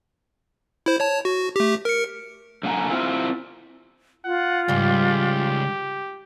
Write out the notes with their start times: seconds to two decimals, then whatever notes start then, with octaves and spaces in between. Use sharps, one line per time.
0.86 E4 C5
1.00 C#5 A5
1.25 F#4
1.56 A3 G4
1.85 A#4 C#7
2.63 F#2 D3 A#3 F#5 G#5 A#5
2.90 C4 E4 F4
4.25 F4 F#5
4.68 C#2 G#2 E3 G3 G4